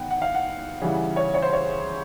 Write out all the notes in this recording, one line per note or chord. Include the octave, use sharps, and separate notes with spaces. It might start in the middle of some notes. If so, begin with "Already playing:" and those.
Already playing: D#3 B3 D#4 F#5 G5
F#5
F5
F#5
C#3 E3 G3
C#5
C#5
C5
C#5